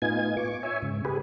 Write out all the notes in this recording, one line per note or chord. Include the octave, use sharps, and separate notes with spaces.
A2 B3 D#4 F4 G#5 G#6
C#6 D6
C#5 E5 G#5
G#2 C#3
G4 G#4 B4